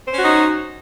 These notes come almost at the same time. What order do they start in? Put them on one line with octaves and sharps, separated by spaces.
C5 C#4 F#4 D#4